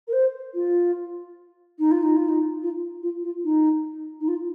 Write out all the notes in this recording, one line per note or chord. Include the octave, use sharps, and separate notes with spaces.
A#4
C5
F4
D#4
F4
D#4
F4
D#4
F4
F4
F4
D#4
D#4
F4